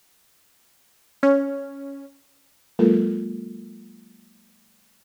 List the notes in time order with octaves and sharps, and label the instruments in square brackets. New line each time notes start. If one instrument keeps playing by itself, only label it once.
[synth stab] C#4
[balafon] F#3 G#3 A#3 F4 A4 A#4